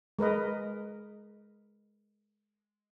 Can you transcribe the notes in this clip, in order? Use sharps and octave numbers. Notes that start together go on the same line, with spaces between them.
G#3 A#4 B4 D#5